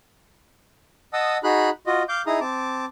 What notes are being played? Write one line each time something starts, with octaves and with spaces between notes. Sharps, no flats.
D#5 F#5 A5 D#6 E6
D#4 F#4 G#4 B5 F#6
F4 F#4 D#5
F5 D6 G6
D#4 E4 G#4 A#5 D#6
C4 A5 D6